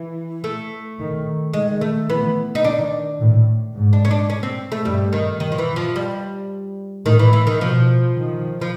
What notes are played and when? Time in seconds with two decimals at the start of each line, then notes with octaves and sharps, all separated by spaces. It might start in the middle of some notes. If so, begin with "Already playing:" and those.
Already playing: E3
0.44 A3
0.99 D#3
1.53 D#3 G#3
1.81 A3
2.10 E3 B3
2.55 D#4
2.64 D#3 D4
3.19 A2
3.75 G#2
3.93 D4
4.05 C#4
4.11 D4
4.30 C#4
4.43 C4
4.72 A3
4.85 G2 G3
5.13 D#3
5.40 D#3
5.52 F3
5.58 E3
5.76 F3
5.96 G3
7.06 A2 D#3
7.19 E3
7.33 E3
7.47 D#3
7.61 B2 F3
8.16 D#3
8.61 F3